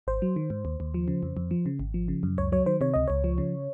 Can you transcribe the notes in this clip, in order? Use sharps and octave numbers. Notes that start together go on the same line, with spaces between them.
G#1 C5
F#3
D#3
G#2
D#2
D#2
F3
C#3
F2
F2
F3
C#3
G#1
F3
C#3
F#2
C#2 C#5
F#3 C#5
D#3 C5
C3 C#5
C#2 D#5
C#2 C#5
F3
C#3